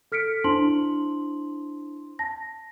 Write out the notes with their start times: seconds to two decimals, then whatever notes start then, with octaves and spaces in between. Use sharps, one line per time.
0.12 A4 F6 B6 C#7 D7
0.44 D4 E4 C5 A5 C6 F#7
2.19 A5 A#6